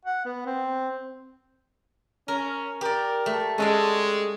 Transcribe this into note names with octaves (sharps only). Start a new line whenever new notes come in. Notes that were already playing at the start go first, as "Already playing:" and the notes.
F#5
B3
C4
C#4 A#4
G4 A#4 D5
A3
G#3 C#4 A4 D5